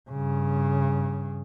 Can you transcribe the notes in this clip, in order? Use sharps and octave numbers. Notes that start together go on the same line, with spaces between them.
G2 C#3